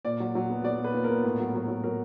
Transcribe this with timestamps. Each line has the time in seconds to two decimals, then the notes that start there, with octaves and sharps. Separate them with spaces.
0.05 A#2 D5
0.20 F#3
0.35 F#3
0.50 B3
0.64 F#3 D5
0.79 A#2
0.84 B4
0.94 A#2
1.04 A#4
1.09 B3
1.24 A2
1.40 F#3
1.55 F#3
1.68 F#3
1.84 F#3 A#4